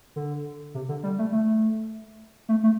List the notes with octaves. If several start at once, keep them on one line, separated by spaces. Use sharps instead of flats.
D3
C3
D3
G3
A3
A3
A3
A3